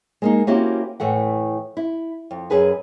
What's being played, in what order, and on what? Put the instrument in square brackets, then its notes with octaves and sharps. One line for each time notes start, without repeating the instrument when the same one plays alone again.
[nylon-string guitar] G#3 A#3 D#4
A#3 C4 C#4 E4 F#4 G4
A2 E3 A3 F#5
E4
F2
F#2 G#4 B4 G#5